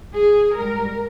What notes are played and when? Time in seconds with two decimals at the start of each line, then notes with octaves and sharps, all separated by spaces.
0.14 G#4
0.54 G#2 G3 A#4